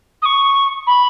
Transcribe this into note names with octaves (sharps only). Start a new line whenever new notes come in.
D#6
C#6
B5